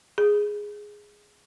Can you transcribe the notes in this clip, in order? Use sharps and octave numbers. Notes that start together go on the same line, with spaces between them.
G#4